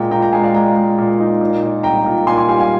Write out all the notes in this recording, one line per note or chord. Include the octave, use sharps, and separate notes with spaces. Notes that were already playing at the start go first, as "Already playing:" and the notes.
Already playing: A#2 G#3 G5 A#5
A#2 G5 A#5
G5 A#5
G#3 F5 G#5
D5 F5
G#3 G5 A#5
G#3
A#2
D#4
A#2
A#2
C2 G5 A#5
A#2
A#2 G#5 C6
G#5 C6
G3 F5 G#5
F5 G#5